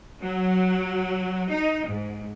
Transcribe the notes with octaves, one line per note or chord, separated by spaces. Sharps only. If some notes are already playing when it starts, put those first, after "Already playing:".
F#3
D#4
G#2